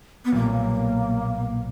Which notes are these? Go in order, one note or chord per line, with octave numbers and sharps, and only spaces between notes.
B3
B1 A#2 G3 A#3